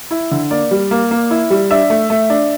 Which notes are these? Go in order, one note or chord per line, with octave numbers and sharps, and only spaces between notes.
E4
D3
A#3 D5
G3
A#3
A#3
E4
G3
D4 E5
A3
A3
D4